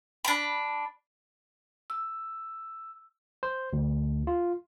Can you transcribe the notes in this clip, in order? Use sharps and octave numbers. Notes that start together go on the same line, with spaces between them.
D4 B5
E6
C5
D2
F4